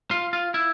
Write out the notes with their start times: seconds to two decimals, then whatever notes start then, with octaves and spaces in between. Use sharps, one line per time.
0.11 F4
0.33 F4
0.54 E4